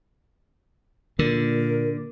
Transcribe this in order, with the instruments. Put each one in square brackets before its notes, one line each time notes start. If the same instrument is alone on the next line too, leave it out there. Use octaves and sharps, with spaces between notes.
[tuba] A#2 [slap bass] D3 [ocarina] A#4